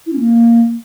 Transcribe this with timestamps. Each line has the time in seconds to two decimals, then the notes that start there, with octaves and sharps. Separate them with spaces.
0.06 E4
0.13 C#4
0.19 A#3